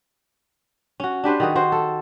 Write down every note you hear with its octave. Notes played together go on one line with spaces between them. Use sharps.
C#4 F#4
D4 G4 B4 C5
D#3 F#4 G#4
F#4 C5
A4